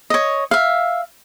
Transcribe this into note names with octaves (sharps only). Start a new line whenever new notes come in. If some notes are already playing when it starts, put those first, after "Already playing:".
C#5 D#5
E5 F5